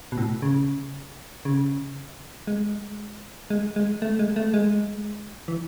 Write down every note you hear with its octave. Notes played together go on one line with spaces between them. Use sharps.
B2
A2
C#3
C#3
G#3
G#3
G#3
A3
G#3
A3
G#3
E3